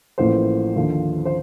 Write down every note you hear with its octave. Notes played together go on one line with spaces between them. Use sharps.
A1 A2 F3 A#3 C5
D#2 D3 F3
C5